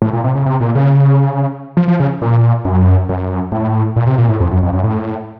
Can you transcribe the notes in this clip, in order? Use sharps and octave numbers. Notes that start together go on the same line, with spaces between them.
A2
A#2
C3
C#3
C3
A#2
C#3
F3
F3
C#3
A#2
F#2
F#2
A2
A#2
C3
A#2
A2
F2
F#2
F2
F#2
A2